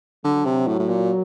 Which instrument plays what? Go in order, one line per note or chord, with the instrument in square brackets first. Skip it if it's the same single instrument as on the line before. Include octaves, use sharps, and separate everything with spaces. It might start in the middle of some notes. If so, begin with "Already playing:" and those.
[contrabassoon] D3 [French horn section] F#3
[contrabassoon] C3
A2
A2
A#2